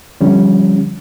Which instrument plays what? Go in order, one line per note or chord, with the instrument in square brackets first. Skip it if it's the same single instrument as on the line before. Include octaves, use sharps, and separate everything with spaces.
[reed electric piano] D3 F3 G3 C#4